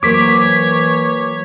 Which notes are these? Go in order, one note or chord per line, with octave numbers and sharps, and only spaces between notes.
E3 F#3 A#3 C5 C#5 D6 B6